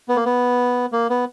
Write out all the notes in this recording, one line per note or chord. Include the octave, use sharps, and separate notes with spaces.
B3
A#3
B3
A#3
B3